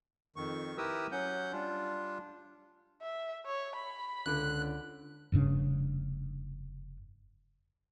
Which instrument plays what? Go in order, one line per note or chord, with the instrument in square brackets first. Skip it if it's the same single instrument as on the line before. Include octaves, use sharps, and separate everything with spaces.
[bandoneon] F2 D#3 C#6
E4 G4 A#4 B4 D#6 E6
F#3 C#4 F#5 G6
G3 D4 F4
[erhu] E5
C#5
B5
[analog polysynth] C#2 D3 [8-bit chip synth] F#6
[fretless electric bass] F1 G2 C#3 D4